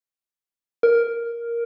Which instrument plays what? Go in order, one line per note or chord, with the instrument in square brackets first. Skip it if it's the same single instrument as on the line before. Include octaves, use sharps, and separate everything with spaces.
[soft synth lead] A#4